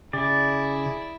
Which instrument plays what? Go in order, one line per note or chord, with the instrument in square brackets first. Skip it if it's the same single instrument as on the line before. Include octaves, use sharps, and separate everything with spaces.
[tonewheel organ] C#3 [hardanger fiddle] E4 [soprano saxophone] G#4 [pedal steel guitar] D5